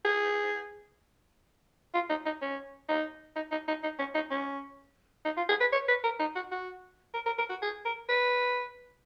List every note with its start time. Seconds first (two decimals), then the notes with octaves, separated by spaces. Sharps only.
0.05 G#4
1.94 F4
2.10 D#4
2.26 D#4
2.42 C#4
2.89 D#4
3.36 D#4
3.51 D#4
3.68 D#4
3.83 D#4
3.99 C#4
4.15 D#4
4.31 C#4
5.25 D#4
5.37 F4
5.49 G#4
5.60 B4
5.72 C#5
5.88 B4
6.04 A#4
6.20 D#4
6.35 F#4
6.51 F#4
7.14 A#4
7.26 A#4
7.38 A#4
7.49 F#4
7.62 G#4
7.85 A#4
8.09 B4